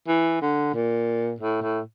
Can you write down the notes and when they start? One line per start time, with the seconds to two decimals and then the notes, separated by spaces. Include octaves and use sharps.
0.08 E3
0.42 D3
0.74 A#2
1.40 A2
1.62 A2